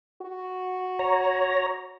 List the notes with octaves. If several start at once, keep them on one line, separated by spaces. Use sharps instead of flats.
F#4
C#5 A#5